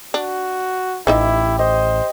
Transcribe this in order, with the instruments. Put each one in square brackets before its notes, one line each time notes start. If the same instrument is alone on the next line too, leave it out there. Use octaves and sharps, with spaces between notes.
[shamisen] D4 [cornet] F#4
[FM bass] A1 [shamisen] F3 D#4 E5 [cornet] E4 [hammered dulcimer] G4
[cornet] C5 [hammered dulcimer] D#5